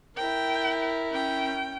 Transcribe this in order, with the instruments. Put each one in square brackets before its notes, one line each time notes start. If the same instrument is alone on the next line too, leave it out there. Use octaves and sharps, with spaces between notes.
[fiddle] E4 A#4 [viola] G5
[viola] C#4 G5